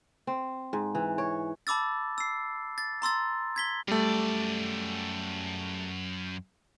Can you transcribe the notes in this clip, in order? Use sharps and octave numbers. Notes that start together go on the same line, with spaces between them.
C4
G#2
E3
C#5
A5 B5 D6 E6 A6
E6 C7
A6
A#5 C6 E6 A6
G#6 B6 G7
F#2 G3 A3 D5